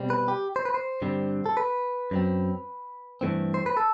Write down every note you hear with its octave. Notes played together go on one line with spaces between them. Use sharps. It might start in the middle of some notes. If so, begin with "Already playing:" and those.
Already playing: B2 G3 C4
B4
G4
C5
B4
C5
G2 D3 G3 C4
A4
B4
F#2 F#3 C4
G2 E3 A3 C4
C5
B4
A4